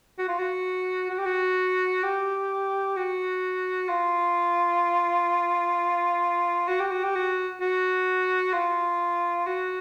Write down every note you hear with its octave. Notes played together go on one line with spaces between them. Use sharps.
F#4
F4
F#4
F#4
G4
F#4
G4
F#4
F4
F#4
G4
F#4
G4
F#4
F#4
F4
F#4